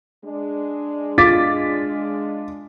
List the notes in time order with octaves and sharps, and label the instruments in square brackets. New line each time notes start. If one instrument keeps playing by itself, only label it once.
[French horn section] G#3 D4
[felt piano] F4 [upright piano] D6 A6 B6